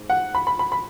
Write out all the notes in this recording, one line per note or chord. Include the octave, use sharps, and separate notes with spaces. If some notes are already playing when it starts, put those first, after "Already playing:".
Already playing: G#2
F#5
B5
B5
B5
B5